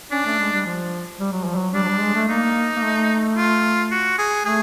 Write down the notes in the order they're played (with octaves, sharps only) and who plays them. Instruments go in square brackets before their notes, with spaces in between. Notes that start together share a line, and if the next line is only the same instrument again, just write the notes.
[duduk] C#4 [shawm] D4
[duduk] A3
G#3
G3
F3
G3
F#3
F3
F#3
[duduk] G3 [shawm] D4
[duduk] F#3
G3
G#3
A3
[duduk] A#3 [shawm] D#4
[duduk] A#3
A3
[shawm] F4
F#4
G#4
[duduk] A3 [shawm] G#4